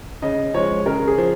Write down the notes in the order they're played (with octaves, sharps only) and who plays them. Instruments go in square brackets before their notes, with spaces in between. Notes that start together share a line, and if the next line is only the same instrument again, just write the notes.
[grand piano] C#3 [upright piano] D#5
[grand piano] F3 G#3 [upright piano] C#5
[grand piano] C#3 [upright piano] A#4
[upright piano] G#4
[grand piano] F3